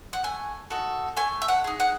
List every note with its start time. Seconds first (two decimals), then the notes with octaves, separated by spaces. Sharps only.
0.13 F#5
0.24 A3 G#5
0.70 D#4 F#4 A4
1.17 A3 G#5
1.42 E5
1.48 F#5
1.64 D#4 G#4
1.80 F#5